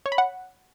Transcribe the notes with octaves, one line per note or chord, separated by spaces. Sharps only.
C#5
B5
F#5